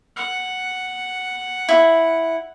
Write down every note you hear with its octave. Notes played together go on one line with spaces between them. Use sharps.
F#5
E4